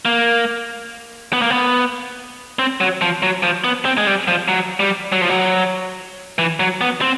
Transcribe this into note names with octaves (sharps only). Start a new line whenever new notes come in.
A#3
B3
A#3
B3
C4
F#3
F3
F#3
F3
B3
C4
G#3
G3
F3
F#3
G3
F#3
F3
F#3
E3
F#3
B3
C4